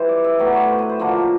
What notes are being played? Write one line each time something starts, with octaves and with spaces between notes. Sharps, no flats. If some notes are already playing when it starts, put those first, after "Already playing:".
Already playing: E3 G3 C5
D5
E5
A2 F#3 B3 D5
C#5
C5
B4
C5
D3 F3 A#3 D4